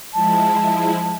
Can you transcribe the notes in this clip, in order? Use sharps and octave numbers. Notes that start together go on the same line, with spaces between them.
F3 G#3 E4 A5